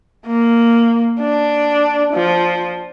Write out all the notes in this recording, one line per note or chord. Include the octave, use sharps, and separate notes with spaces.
A#3
D4
F3